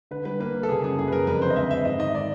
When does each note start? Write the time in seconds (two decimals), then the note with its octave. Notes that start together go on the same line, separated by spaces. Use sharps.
0.11 D3 B4
0.25 G3 B4
0.40 A#3 B4
0.55 A#3
0.63 A4
0.69 C#3 G#4
0.84 F#2 G#4
0.98 F#2 G#4
1.08 B4
1.12 C#3 A#4
1.27 F2 B4
1.41 D3 C5
1.50 D#5
1.56 F2 E5
1.71 F2 E5
1.85 G#2 D#5
2.00 D#3 D#5
2.14 D#3 D5